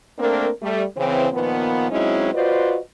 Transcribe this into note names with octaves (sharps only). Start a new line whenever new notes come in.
A3 A#3 C4 D4 A#4
G3 A3
C#3 E3 C4
A#2 D#3 F3 B3
F#3 G#3 C4 C#4 D#4 E4
F4 F#4 B4 C5 D5 D#5